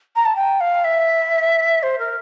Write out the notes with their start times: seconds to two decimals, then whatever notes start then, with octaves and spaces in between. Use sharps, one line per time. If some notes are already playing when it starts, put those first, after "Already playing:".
0.16 A#5
0.25 A5
0.36 G5
0.60 F5
0.84 E5
1.83 C5
1.99 A#4